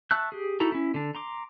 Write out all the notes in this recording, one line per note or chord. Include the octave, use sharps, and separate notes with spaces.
E5 A5 C#6 E6 F#6
G4 G#4
D#4 E4 F#4 A4 A#5
C#4 E4
D3 D4
A#5 C6 D6